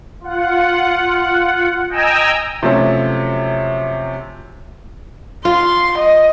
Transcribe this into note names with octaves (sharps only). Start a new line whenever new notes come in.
F4 F#5
D#5 G5 G#5 A#5 E6
C3 F3 F#3 A3 C#4
F4 C6
D#5